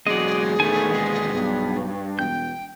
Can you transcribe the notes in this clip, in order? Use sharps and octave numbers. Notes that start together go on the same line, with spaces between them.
E1 F#3 G#3 G#4 D5 D#5
D#3 A3 B3 G#5
D#2 G#3
B1 G2
E1 G5 G6